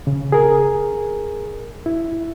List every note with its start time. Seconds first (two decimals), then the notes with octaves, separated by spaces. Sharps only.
0.07 C#3
0.32 G#4 A#4
1.86 E4